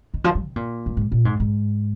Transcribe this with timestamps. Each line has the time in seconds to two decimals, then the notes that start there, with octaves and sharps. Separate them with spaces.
0.14 D#3
0.24 F3
0.35 G3
0.45 C3
0.56 A#2
0.86 G2
0.97 G#2
1.12 A#2
1.25 G#2
1.40 G#2